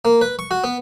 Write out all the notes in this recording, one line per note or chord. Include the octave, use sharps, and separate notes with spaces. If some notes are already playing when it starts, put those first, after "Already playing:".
A#3
B4
C#6
F#4
B3